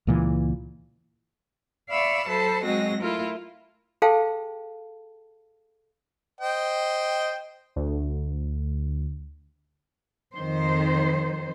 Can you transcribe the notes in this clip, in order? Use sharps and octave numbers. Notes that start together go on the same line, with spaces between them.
C#2 A#2 E3
D5 E5 F5 B5 C#6 E6
F#3 A4 C5 A5 B5
F#3 G#3 C4 F#4 D#5 A#6
A3 E4 F4 A#4
G#4 A4 C5 F5 G5 A5
C5 D#5 G5
D2
F2 D#3 C5